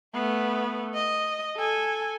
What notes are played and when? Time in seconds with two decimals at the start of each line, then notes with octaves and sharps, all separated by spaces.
0.14 A3 B3
0.95 D#5
1.56 A4 G#5